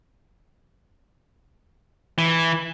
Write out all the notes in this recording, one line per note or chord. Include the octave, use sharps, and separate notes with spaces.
E3